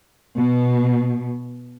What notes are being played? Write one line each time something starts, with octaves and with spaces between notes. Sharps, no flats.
B2